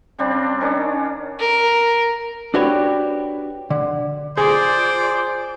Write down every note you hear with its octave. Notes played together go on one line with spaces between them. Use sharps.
C#3 G3 C4 D4
D#3 C#4 D4
A#4
D4 F#4 G4 B4 C#5
D3
F4 G#4 C5 D5